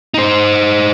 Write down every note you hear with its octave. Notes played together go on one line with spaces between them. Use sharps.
D#4 C5